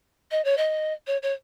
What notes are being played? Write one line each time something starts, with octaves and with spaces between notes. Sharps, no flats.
D#5
C#5
D#5
C#5
C#5